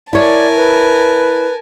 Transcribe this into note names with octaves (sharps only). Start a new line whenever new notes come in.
E4 A#4 C#5 D5 G#5 A5
B4